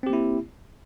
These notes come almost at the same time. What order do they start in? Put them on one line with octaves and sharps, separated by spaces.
C4 G4 A#3 E4